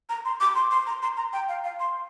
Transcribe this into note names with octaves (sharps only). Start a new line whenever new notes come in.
A#5
C6
D6
C6
C6
A#5
C6
A#5
G5
F5
F5
C6